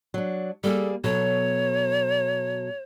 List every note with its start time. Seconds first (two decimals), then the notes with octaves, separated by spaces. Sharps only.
0.14 F#3 D4
0.64 G3 A#3 G#4 A4
1.04 B2 F#3 A4 C#5